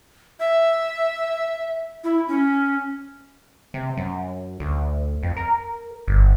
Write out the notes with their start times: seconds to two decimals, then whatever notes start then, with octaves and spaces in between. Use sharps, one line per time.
0.40 E5
2.04 E4
2.28 C#4
3.74 C3
3.97 F#2
4.60 D2
5.23 F2
5.37 A#4
6.08 G1